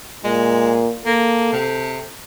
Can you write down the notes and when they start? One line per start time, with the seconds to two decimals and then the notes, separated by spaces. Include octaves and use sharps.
0.24 A#2 G#3
1.06 A#3 A4
1.53 C3